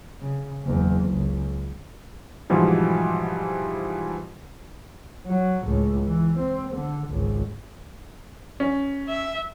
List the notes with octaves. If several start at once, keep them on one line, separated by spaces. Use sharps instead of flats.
C#3
F#1 E2
C#2
G#2 B2 E3 F3 G3
F#3
C#2 A2
E3
C4
D3
G#1 C#2
C#4
E5